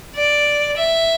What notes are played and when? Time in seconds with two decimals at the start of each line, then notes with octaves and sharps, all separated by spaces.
0.16 D5
0.77 E5